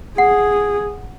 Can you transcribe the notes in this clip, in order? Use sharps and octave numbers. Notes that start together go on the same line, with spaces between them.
G#4 F#5